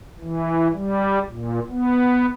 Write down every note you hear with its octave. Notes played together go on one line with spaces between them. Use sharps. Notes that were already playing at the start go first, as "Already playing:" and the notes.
E3
G3
A#2
B3